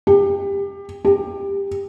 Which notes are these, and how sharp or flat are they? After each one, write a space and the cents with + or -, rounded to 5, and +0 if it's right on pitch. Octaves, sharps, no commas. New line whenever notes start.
G4 +25
G4 +20